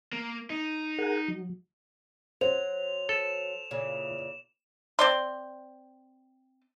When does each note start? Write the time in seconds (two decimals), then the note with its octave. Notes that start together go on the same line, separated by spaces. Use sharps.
0.13 A#3
0.50 D#4
0.98 G#4 A#4 F#5
1.28 F#3
2.41 F#3 C5 F7
3.09 A4 E7
3.71 A#2 C#3 E3
4.99 C4 D5 C6